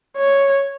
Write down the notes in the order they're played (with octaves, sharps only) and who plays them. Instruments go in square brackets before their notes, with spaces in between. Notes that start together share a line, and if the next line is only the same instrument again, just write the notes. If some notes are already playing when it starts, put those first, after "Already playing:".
[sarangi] C#5